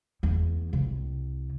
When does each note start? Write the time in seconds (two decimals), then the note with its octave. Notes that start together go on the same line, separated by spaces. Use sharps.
0.23 E2
0.73 C2